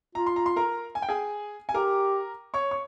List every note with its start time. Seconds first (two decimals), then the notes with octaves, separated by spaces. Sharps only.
0.15 F4 A#5
0.27 C6
0.36 A#5
0.46 C6
0.56 A#4 A#5
0.95 G#5
1.02 G5
1.09 G#4 G#5
1.69 G#5
1.74 G4 A#4 A#5
2.54 C#5 C#6
2.71 C#6